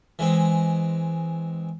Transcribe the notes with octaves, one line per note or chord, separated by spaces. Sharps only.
E3 G#3 C4